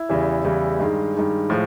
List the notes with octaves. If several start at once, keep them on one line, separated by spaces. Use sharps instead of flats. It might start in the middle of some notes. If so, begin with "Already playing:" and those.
Already playing: E4
E2 C#3 E3 G3
E2 C#3 E3 G3
G2 D#3 G#3
G2 D#3 G#3
A2 F3 G#3